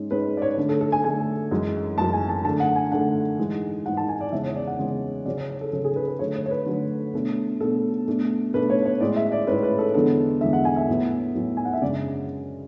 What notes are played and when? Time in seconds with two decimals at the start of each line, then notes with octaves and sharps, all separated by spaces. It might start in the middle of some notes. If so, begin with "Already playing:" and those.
Already playing: G#2 G#3 C#4
0.10 G#2 G#3 C#4 B4
0.37 D5
0.42 C#5
0.57 D3 A3 D4
0.69 A4
0.81 A4
0.92 G#5
1.04 D3 A3 D4 G#5
1.51 F#2 E3 G#3
1.98 F#2 E3 G#3 A5
2.13 G#5
2.29 A5
2.45 D3 A3 D4 A5
2.60 F#5
2.76 G#5
2.92 D3 A3 D4 F#5
3.38 G#2 E3 G#3
3.85 G#2 E3 G#3 F#5
3.97 A5
4.09 G#5
4.21 D5
4.32 E2 C#3 G#3 C#4 E5
4.44 C#5
4.56 D5
4.67 F#5
4.79 E2 C#3 G#3 C#4
5.25 C#3 F#3 C#4 D5
5.38 C#5
5.50 C#5
5.61 A4
5.73 C#3 F#3 C#4 A4
5.84 G#4
5.96 B4
6.08 B4
6.19 D3 F#3 A3 C#5
6.36 C#5
6.46 C#5
6.51 B4
6.66 D3 F#3 A3
7.13 B2 A3 D4
7.60 B2 A3 D4 A4
8.07 B2 A3 D4
8.54 B2 A3 D4 B4
8.70 C#5
8.85 C#5
9.01 A2 G#3 C#4 D5
9.16 E5
9.32 D5
9.47 A2 G#3 C#4 B4
9.63 B4
9.79 A4
9.94 E2 D3 G#3 B3 D4 A4
10.41 E2 D3 G#3 B3 D4 E5
10.53 F#5
10.65 G#5
10.76 E5
10.88 A2 F#3 B3
11.35 A2 F#3 B3
11.57 G#5
11.65 F#5
11.73 E5
11.82 F#2 C#3 G#3 D4 D5